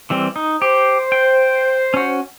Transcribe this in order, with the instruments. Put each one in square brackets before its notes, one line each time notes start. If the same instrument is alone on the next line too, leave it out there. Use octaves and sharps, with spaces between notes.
[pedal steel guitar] E3 G3 C4
D#4
[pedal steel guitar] G4 [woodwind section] C5
[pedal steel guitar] G5
C#4 F#4